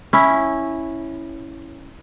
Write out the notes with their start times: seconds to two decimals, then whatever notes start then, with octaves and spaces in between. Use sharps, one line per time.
0.13 C#4 E4